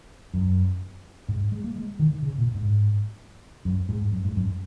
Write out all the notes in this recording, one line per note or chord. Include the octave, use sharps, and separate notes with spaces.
F#2
G#2
G#3
A#3
G#3
D#3
C#3
A#2
G#2
F#2
G#2
F#2
G#2
F#2